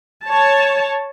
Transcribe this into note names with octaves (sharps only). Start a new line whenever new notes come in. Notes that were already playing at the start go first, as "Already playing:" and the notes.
C#5 A5